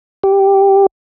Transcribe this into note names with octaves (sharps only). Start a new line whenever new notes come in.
G4